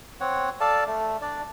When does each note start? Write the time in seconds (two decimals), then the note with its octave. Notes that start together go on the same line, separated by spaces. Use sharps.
0.20 C4 C#5 F#5
0.61 A4 D5 F5 A5
0.87 A3
1.22 D4 D5